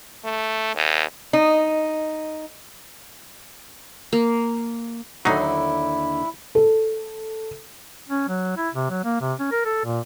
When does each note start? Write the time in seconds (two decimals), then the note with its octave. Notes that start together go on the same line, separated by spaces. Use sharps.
0.24 A3
0.75 D#2
1.33 D#4
4.13 A#3
5.25 D#2 D3 F#3 D#4 E4
6.55 A4
8.09 C#4
8.29 F#3
8.57 E4
8.74 C3
8.90 F#3
9.04 A#3
9.21 C3
9.40 C#4
9.52 A#4
9.65 A4
9.85 A#2